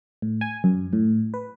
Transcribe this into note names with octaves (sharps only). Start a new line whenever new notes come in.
A2
G#5
F#2
A2
B4